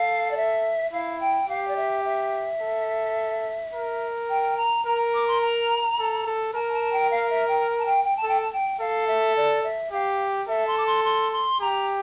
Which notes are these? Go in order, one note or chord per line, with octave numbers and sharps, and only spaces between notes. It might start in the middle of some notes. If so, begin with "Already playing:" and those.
Already playing: A4 F5
D5
E5
E4 F5
G5
G4 F5
D5
E5
E5
A4
A#4
G5
A#5
A#4 A#5
D6
C6
A#5
A4
A4
A#4 A5
A5
A5
G5
F5
E5
G5
A5
G5
G5
A5
A4
G5
A5
G5
A4 F5
E5
D5
E5
G4 F5
A4 E5
C6
D6
C6
C6
C6
G4 A#5